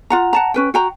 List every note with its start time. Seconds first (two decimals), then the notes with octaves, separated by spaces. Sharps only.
0.10 F4 F#5 A#5
0.33 F#5 A5 A#5
0.54 C#4 B4 G5
0.74 F#4 G5 A#5